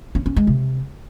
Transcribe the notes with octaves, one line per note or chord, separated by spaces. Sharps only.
C#4
C#4
G#3
C3